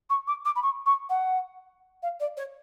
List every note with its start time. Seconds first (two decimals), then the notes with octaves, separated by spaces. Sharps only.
0.10 C#6
0.27 D6
0.45 D6
0.56 B5
0.63 C#6
0.86 C#6
1.09 F#5
2.03 F5
2.20 D5
2.37 C#5